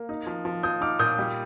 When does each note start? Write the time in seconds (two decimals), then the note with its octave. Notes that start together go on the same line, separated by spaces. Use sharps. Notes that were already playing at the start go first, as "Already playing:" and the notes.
Already playing: A#3
0.09 D#4
0.27 F3
0.45 F3
0.63 F3 D#6 G6
0.81 D#4 D6 F6
0.99 A#2 D#6 G6
1.19 G3